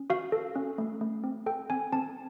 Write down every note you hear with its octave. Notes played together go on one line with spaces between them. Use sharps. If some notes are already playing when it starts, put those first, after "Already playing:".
Already playing: C#4
F#4 F5
A4
C#4
A3
A3
C4
A4 G5
C4 G#5
C4 A5